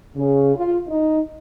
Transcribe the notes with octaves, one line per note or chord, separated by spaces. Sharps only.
C#3
F4
D#4